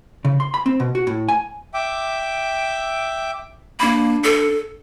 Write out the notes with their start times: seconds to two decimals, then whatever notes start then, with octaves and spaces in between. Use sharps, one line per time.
0.25 C#3
0.40 C6
0.54 B5
0.66 C4
0.80 B2
0.95 F#4
1.07 A2
1.29 G#5
1.74 E5 G5 D6
3.80 A#3 D4 B5
4.23 A4